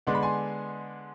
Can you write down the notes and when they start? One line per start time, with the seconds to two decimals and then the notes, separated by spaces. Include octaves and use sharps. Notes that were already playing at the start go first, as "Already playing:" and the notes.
0.07 D3 G#3 B3 D4 C6
0.15 B5
0.22 G#5 C6